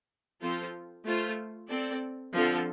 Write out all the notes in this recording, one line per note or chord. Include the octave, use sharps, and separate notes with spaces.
F3 C4 F4 A4 C5
A3 F4 C5
C4 A4 D5
D3 F3 C4 F4 A4